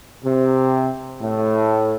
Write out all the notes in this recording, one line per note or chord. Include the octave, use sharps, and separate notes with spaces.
C3
A2